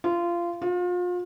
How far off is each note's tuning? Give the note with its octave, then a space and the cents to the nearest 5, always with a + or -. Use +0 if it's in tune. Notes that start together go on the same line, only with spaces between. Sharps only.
F4 -20
F4 +35